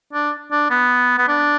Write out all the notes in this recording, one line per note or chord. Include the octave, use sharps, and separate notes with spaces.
D4
D4
B3
B3
D4